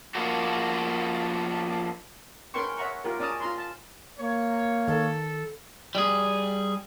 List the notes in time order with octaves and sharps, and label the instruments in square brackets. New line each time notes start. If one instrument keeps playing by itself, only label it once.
[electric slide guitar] F3 A#3 C#4 D4 F#4
[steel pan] C#4 A#4 B4 G5 C6 C#6
C#5 E5 F#5 A#5 C#6
F4 G4 A#4
C#4 D5 A5 A#5 D#6
F4 A#5 C6
A5
[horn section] A#3 C#5
[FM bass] D#3 [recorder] A4
[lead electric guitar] G3 G#4